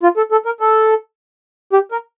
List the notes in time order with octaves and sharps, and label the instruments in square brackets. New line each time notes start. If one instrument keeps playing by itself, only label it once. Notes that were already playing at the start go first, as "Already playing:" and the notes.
[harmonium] F4
A4
A4
A#4
A4
G4
A#4